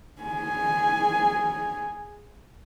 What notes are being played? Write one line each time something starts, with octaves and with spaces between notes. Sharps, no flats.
G#4 G#5